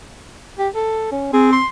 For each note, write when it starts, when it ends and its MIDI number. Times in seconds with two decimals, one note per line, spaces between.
0.59 0.69 67
0.75 1.11 69
1.12 1.32 61
1.33 1.59 60
1.33 1.51 68
1.52 1.67 84